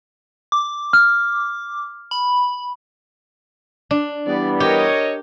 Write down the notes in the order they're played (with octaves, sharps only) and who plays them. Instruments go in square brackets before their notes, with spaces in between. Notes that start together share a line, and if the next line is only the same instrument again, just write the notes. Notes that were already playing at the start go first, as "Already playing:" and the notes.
[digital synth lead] D6
[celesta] F6
[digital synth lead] B5
[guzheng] D4
[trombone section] E3 G3 B3 [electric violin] D5
[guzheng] G4 [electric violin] A#4 [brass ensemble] C#5 D#5